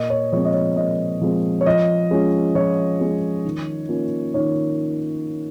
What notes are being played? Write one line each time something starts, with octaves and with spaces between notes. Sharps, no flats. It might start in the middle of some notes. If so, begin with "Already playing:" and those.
Already playing: A#2 D#5
C#5
F3 G#3 C4 C#5
D#5
C#5
A#2 D#5
F3 G#3 C4
C#5
F3 D#5
G#3 C#4 F4
F3 C#5
G#3 C#4 F4
D#3
A#3 C#4 F4
D#3 C#5